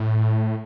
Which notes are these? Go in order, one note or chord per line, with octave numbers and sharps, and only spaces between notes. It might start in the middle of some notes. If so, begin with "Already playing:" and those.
Already playing: A2